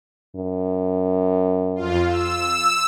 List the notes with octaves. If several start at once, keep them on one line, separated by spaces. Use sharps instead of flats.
F#2
F2 F4
E6